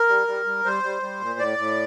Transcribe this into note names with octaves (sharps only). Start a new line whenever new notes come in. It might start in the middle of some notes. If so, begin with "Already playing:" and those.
Already playing: A#4
G3
G3
G3
G3 C5
G3
G3
A#2
A2 D5
A2